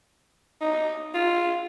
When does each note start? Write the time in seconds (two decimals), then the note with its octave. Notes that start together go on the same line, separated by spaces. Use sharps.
0.61 D#4
1.15 F4